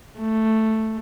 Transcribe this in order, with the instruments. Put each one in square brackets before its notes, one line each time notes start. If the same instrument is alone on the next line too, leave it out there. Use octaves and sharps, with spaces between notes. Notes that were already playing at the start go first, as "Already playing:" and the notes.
[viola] A3